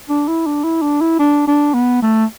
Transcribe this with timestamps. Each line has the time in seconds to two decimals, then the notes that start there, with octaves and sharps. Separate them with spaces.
0.09 D4
0.28 E4
0.46 D4
0.64 E4
0.82 D4
1.01 E4
1.19 D4
1.47 D4
1.74 B3
2.02 A3